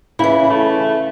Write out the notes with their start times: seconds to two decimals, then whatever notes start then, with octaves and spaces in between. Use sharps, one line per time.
0.19 C#3 E3 E4
0.50 A3